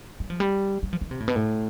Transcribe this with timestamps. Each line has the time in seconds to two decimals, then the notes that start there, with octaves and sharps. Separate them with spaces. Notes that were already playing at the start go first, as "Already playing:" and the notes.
0.20 G3
0.30 F3
0.40 G3
0.83 G3
0.93 F3
1.01 E3
1.11 C3
1.20 A2
1.28 B2
1.36 A2